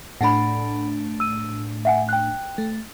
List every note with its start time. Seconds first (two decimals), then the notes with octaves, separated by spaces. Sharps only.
0.21 A2 A3 D4 F#5 B5
1.20 E6 D#7
1.85 E5 F#5 G#5
2.09 G5 F#6
2.58 A3